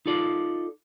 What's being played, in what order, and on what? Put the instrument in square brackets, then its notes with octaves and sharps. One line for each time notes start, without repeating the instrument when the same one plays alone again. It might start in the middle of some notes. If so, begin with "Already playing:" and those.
[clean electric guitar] D#4 F4 A4 D5